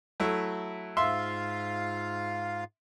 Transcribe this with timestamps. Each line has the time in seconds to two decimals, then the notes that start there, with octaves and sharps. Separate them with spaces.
0.20 F#3 A3 E4
0.97 G#2 F4 E5 F5 C6